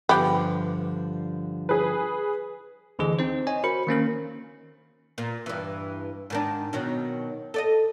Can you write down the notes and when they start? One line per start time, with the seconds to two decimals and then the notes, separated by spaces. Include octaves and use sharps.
0.09 G2 D3 F3 B3 G4
1.69 G#4 B4
2.99 D2 D3 E3 G#4 D#5
3.19 C4 D#4 C5
3.47 C#5 D#5 G#5
3.64 F#4 A#4 C5 B5 C#7
3.87 D#3 A#3 C#4 A#4
5.18 A#2
5.46 G2 E3
6.30 G#2 D#3 D4
6.73 B2 D#3 F#3
7.54 A4 D5 D#5